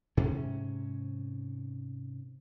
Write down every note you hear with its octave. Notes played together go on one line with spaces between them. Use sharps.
G#2 C3 C#4